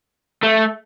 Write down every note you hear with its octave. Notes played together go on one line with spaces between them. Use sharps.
A3